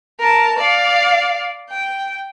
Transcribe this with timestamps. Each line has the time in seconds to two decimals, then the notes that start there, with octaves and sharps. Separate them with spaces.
0.19 A#4 A5
0.58 D5 F5
1.71 G5